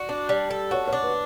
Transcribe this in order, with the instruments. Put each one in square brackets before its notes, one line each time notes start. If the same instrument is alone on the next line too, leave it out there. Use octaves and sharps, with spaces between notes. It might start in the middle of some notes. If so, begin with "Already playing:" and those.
Already playing: [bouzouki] F#4 [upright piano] D5
[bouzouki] D4
G3
A4
[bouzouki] F#4 [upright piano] C#5
[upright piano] C#5
[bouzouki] D4
[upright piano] B4